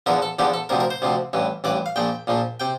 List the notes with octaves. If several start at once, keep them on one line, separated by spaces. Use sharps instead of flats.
E2 D3 F3 A#4
A4
E2 D3 F3 G4
A4
D2 C3 F3 A#4
A#4
C5
D2 C3 F3
A1 G2 E3
A1 G2 E3 D5
F5
A#1 A#2 F3 G5
A#1 A#2 F3
C3 G5